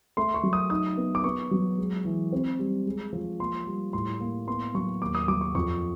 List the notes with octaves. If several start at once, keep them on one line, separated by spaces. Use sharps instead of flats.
A3 C6
C#6
F#3
D#6
D#4 D#6
B3
D6
B3 C#6
F#3
G#3
E3
C4
G3
G#3
F3
A#3 C6
G3
A2 C6
A#3
B3 C6
F#3 C#6
D#2 D6
D#6
F#3 D6
C#6
F2 C#6